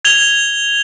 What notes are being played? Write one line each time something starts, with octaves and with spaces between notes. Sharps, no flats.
G#6 F7 G7